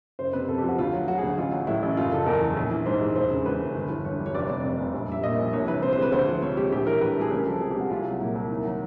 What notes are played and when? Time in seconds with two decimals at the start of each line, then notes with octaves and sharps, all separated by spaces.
0.19 F#1 C5
0.33 C3 B4
0.49 F2 A4
0.58 G4
0.63 F3
0.69 F#4
0.78 D2 F4
0.92 F#3
1.08 D3 F#4
1.18 G#4
1.23 D2
1.37 A1 F4
1.52 F#3
1.67 A2 E4
1.82 A1
1.97 F#1 F4
2.12 C#3 A4
2.26 E2 A#4
2.42 E3
2.56 A#1
2.71 E3
2.86 G#2 C5
3.01 G#3
3.16 E1 C5
3.31 C#3
3.46 E2 B4
3.60 E1
3.75 G1
3.90 E3
4.05 G2 C#5
4.20 G3
4.26 C#5
4.34 F1 D5
4.49 C3 D5
4.64 F2
4.79 F1
4.94 A#1
5.09 G3 E5
5.23 A#2 D#5
5.39 A#1
5.53 C2 C#5
5.68 E3 B4
5.83 C3 C5
5.93 C5
5.98 G#3 B4
6.12 D2 C5
6.28 F3
6.42 C3 C#5
6.57 G#3 G4
6.72 A#1 G4
6.87 E3 A#4
7.01 A2 B4
7.12 A4
7.17 G3 G#4
7.31 C#2 A#4
7.46 F3 A4
7.61 C3 G#4
7.71 G4
7.76 G#3 F#4
7.90 C2 F4
8.05 F#3
8.20 A#2 E4
8.35 C2
8.50 D#2
8.65 F#3